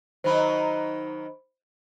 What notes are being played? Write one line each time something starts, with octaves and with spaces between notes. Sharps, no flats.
D#3 F#3 D#4 C5 B5